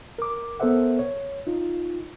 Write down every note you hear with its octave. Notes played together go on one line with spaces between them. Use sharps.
A#4 D6
B3 A4 A#4 C5 E5 F#5
C#5
D#4 F4